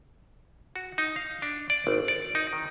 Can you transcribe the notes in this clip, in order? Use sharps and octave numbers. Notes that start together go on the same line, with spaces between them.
F#4
D#4
F5
D4
D5
G#1
D5
D#4
D#3